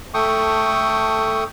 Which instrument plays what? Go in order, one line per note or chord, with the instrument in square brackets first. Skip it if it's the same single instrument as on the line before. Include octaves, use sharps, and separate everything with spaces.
[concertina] A3 A4 G5 C#6 D#6